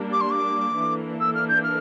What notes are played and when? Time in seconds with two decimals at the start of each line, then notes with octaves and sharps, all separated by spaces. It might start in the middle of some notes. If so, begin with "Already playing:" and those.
Already playing: G3 A#3 D4
0.12 D6
0.20 C6
0.30 D6
0.77 E3 A#3 D4 A4
1.20 E6
1.34 F6
1.48 G6
1.63 F6